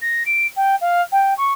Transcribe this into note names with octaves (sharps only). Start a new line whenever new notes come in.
A#6
D7
G5
F5
G5
C#6